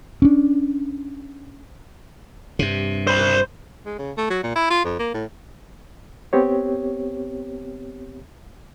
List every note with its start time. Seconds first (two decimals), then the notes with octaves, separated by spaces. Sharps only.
0.22 C#4 D4
2.59 G2 C3
3.07 C5 B5
3.86 G#3
3.98 C#3
4.17 A3
4.30 F#3
4.43 A#2
4.56 E4
4.70 F4
4.84 F2
4.99 A#3
5.14 A2
6.33 B3 C4 G4 C#5